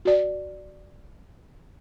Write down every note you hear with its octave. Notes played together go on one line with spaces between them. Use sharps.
F#4 D5